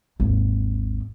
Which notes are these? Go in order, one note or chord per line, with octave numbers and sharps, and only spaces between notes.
G#1 D#2